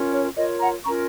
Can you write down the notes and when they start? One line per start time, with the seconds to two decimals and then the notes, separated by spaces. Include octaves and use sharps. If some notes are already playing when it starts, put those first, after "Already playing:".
Already playing: C#4 F4 A#4
0.13 C#5
0.37 F4 A#4 C#5 D#5
0.61 F#5 A#5
0.85 C#4 F4 A#4 A#5 C#6